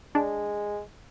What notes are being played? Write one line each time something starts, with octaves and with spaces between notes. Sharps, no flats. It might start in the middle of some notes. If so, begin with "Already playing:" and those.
G#3 D4